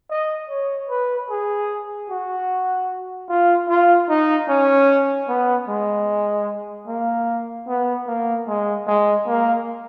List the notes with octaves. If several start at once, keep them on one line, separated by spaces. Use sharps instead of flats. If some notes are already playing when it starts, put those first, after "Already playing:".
D#5
C#5
B4
G#4
F#4
F4
F4
D#4
C#4
B3
G#3
A#3
B3
A#3
G#3
G#3
A#3